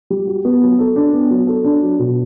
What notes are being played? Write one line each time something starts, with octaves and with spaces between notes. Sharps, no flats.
G3
F#4
B3
F#3
A4
D4
B3
F#3
A4
D4
F#3
B2